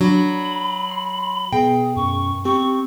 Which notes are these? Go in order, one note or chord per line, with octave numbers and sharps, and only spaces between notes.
F#3 D4 B5
C6
B2 G#4 G5
F#2 C#6
C4 G4 C#6